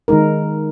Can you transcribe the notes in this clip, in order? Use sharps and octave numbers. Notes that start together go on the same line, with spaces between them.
D#3 G#3 D#4 A#4